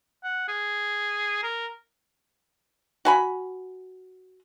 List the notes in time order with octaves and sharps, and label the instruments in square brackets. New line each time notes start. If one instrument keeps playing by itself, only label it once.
[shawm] F#5
G#4
A#4
[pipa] F#4 G#5 B5